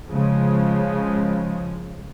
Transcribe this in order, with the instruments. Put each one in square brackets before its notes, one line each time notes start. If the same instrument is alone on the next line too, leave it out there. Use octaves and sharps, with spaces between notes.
[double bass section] C#3 F3 G#3